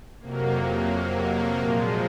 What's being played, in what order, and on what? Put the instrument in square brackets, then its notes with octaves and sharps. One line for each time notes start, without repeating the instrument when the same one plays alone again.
[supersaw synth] F2 C3 F#3 A#3
A#3
A#2 F3 G#3